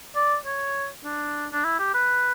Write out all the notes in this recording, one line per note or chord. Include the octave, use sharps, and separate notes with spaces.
D5
C#5
D4
D4
E4
G4
B4